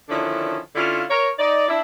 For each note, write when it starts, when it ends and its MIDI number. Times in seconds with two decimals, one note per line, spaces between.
0.09 0.57 50
0.09 0.57 51
0.09 0.57 53
0.09 0.57 61
0.09 0.57 62
0.09 0.57 64
0.75 1.03 50
0.75 1.03 61
0.75 1.03 64
0.75 1.03 65
1.10 1.28 70
1.10 1.28 73
1.38 1.68 63
1.38 1.68 74
1.68 1.81 62
1.68 1.81 64